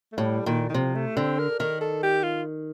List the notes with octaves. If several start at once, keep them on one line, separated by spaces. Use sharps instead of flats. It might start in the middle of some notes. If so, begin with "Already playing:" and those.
A3
A2 G3
A#2 D#3
D#3
C3 F3
A3
D3 C4
A#4
D#3 A#4
A4
G4
F4